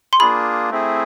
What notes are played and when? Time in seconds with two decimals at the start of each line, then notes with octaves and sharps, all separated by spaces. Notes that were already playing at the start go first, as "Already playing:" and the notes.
0.13 C6
0.19 A#3 D4 F4 G#4 B5
0.70 A3 C4 E4 G#4